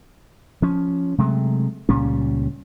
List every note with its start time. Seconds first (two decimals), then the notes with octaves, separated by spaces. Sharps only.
0.62 F3 C#4
1.18 C3 F#3 G#3 A3
1.89 C#2 A#2 G3 C#4